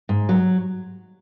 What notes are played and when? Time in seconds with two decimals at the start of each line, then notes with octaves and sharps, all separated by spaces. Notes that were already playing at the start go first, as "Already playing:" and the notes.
0.09 G#2
0.29 F#3